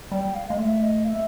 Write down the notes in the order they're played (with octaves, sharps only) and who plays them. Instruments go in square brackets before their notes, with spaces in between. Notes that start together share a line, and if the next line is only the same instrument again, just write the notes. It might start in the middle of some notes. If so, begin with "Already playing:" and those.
[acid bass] G3 [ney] G5
[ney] F5
[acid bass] G#3 [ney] F5
[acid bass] A3 [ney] E5
[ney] D#5
F5
E5